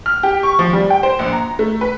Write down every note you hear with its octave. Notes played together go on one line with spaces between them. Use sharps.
F6
G4
C#6
F3
G3
G5
C5
A#1
A#5
A3
B4